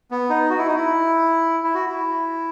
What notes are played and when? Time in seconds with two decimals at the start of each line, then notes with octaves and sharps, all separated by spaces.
0.11 B3
0.30 D#4
0.50 F#4
0.58 E4
0.67 D#4
0.76 E4
1.64 E4
1.75 F#4
1.86 E4